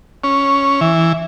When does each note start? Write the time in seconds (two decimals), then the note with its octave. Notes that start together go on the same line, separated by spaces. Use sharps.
0.24 C#4
0.81 E3